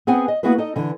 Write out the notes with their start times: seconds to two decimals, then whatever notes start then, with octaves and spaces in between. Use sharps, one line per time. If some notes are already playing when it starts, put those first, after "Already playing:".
0.07 B3 C4 G#4 B4 F#5 G#5
0.28 D#5
0.43 A#3 B3 E4 F#4 G#4 B4
0.58 D#4 A4 D#5
0.76 D3 E3